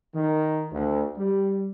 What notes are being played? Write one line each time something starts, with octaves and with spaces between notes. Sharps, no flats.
D#3
D2
G3